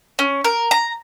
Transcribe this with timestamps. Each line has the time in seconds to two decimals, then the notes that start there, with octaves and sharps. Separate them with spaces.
0.19 C#4
0.44 A#4
0.71 A#5